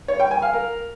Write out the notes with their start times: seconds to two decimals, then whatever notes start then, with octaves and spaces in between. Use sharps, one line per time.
0.08 C#5
0.20 G5
0.31 G#5
0.42 F5
0.53 A#4